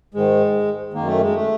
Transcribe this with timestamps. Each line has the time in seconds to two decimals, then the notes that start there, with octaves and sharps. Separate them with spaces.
0.14 G#2 D#3 G#3
0.94 F#2 D#3 A#3
1.07 A3
1.21 G#3
1.35 A3